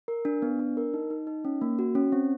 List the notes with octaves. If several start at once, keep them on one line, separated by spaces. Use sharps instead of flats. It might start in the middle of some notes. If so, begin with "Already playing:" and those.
A#4
D4
B3
D4
A#4
D#4
D#4
D#4
C#4
A#3
F#4
C#4
C4